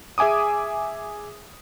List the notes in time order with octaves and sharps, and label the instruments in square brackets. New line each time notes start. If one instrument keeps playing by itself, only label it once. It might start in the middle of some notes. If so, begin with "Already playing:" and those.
[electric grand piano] G#4 E5 G#5 D6 D#6